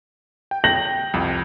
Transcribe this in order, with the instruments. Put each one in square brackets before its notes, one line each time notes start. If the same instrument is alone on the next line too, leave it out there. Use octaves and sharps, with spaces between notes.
[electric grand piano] G5
[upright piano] G6 A#6 F#7
[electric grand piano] C2 F2